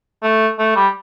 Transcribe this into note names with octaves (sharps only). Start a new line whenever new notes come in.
A3
A3
G3